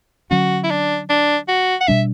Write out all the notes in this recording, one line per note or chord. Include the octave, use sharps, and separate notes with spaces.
D3 F#3 C#4 F#4
E4
D4
D4
F#4
F#5
B2 G3 D4 E5